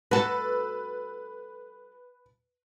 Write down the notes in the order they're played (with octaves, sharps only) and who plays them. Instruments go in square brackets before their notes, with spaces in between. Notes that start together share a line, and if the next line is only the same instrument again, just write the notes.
[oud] F#4 A4 [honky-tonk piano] B4